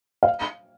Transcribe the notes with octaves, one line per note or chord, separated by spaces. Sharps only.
F5